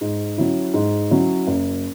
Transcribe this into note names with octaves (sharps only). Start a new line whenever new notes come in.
G#2
F#3 C#4 E4
G#2
F#3 C#4 E4
F#1